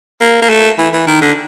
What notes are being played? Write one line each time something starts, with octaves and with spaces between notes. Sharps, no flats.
A#3
A#3
A3
E3
E3
D#3
D3